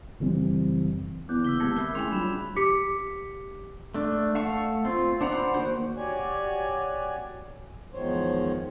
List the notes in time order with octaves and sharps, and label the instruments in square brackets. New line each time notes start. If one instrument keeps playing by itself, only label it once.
[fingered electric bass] F#1 E3 G3 C4
[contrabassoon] E2 [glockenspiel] D6 F#6 G6
[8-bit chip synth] C#3 A#3 [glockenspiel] E6 B6 G7
[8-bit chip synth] D#3 G4 [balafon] G#3 A#3 C4 [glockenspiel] G#6
[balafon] A#4 E5 B5
[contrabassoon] C#3 [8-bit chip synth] A3 [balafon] E4 G5 G#5 [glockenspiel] G#6 F7
[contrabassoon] F#3 [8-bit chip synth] G3 D4 F4 [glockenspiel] B5 E7
[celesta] G4 D6 B6 C#7
[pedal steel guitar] A3 D4
A3 F5 F#5 A5 C#6
C4 F4
D4 C5 F#5 A#5 B5
D#3 A#3 F#4 C5
[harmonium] F#4 G4 C#5 D5 G#5
E2 G#2 D#3 F3 C5 C#5